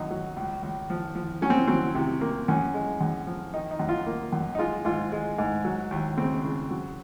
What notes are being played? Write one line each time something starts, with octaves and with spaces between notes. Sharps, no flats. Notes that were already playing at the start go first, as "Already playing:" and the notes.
Already playing: F#2 D#3 D#4
F#3
C#2
C#2
F3
F3
F#3 C#4
C4
F#3 C4
C3
A#3
F#2 C#4
G#3
F#2
F3
D#3 D#4
D#4
F#2
F4
A#3
F#2
D#4
G#3 F4
G#2 F4
G#3
G#2
F#3
D#2
C#3 C4
C#3
F#3